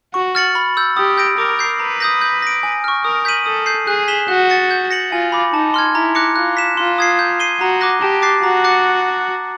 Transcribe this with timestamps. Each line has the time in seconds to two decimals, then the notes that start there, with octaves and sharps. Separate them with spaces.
0.14 F#4 C#6
0.35 F6 A6 C#7 F#7
0.55 B5
0.77 E6 G6
0.97 G4 D#6
1.18 G6 A#6 D7
1.38 A#4 D6
1.59 G6 C7
1.80 B4 A#5
2.00 D#6 G6 A#6
2.21 G6
2.42 A#6 D7
2.63 G#5
2.84 C#6 F6
3.04 A#4 D#6
3.25 G6 B6 D#7 F#7
3.46 A4 D#6
3.66 G6 C7
3.87 G#4 F#6
4.08 B6 E7 G7
4.28 F#4 F#6
4.50 A6 C#7
4.71 G6
4.91 A#6 C#7 F#7
5.11 F4 G#5
5.32 B5 D6
5.53 D#4 A5
5.74 C6 F6 G#6
5.95 E4 A#5
6.15 D6 F#6 A#6 C#7
6.36 F4 F#6
6.57 B6 E7
6.77 F4 C6
6.98 D#6 G#6 C7
7.19 G6
7.40 C7 D#7 G7
7.61 F#4 A#5
7.81 D6 F#6 A#6
8.02 G4 A5
8.22 D6 F#6 A6 C7
8.43 F#4 A#5
8.64 D6 F#6 A6 C#7